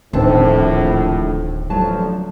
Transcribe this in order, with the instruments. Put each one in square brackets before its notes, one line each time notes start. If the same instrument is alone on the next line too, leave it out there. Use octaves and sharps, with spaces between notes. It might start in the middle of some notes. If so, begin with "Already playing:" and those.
[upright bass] D1 [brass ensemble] A#1 F2 A2 [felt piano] D#3 C4 [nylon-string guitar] D4 A5
[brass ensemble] A1 D3 F3 [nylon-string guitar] F#3 A5